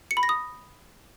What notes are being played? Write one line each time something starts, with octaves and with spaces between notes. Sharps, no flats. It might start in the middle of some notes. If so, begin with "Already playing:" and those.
C#7
B5
A#6
D#6